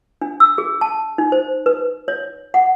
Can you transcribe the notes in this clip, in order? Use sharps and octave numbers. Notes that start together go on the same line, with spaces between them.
D4
E6
G#4
A5
D#4
C5
B4
C#5
F#5